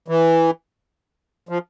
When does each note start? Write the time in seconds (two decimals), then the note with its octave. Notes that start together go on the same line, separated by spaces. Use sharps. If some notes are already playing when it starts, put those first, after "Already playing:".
0.08 E3
1.49 F3